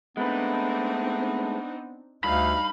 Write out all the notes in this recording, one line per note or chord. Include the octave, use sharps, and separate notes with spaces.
G#3 A3 B3 C4 D4 D#4 B4
D2 G2 D#4 F5 B5